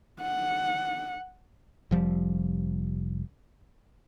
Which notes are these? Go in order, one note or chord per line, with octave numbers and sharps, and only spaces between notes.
F#5
F1 F3 G3